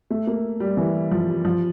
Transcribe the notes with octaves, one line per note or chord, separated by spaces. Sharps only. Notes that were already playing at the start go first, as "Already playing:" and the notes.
A3
A#3
G3
E3
F3
F3